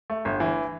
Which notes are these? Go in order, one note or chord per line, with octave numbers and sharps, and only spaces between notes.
A3
G1
E3